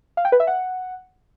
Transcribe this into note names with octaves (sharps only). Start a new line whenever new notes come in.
F5
G5
B4
E5
F#5